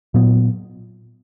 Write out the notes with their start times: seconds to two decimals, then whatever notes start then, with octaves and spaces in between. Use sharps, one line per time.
0.14 A#2 F#3 B3